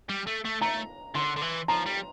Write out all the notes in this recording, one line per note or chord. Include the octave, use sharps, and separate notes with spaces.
G3
A3
A3
A3 A#5
D3 C6
D3
E3
F3 A#5
G3